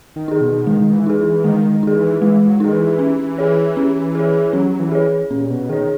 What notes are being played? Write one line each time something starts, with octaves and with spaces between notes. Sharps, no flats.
D#3
D#4 G#4
B2
D#3 G#3
D#3
E3
D#4 G#4
E3
D#3 G#3
D#3
D#3 D#4 G#4
E3
E3 G#3
E3
F#3
D#3 D#4 G#4
E3
C#4
G#4 C#5
C#4
G#4 C#5
F#3 C#4
E3
G#4 C#5
A#2 C#4
B2
D#3 G#4 C#5